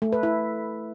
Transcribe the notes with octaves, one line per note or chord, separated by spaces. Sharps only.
A3
B4
E4